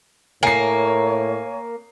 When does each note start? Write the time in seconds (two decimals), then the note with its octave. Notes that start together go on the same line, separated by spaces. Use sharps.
0.43 A2 A#3 C#5 G#5 C7